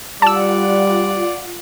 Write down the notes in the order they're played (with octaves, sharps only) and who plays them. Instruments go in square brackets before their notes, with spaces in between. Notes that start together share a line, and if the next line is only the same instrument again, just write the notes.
[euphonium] G3 [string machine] F4 F#5 [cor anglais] D5 [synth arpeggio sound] A5 E6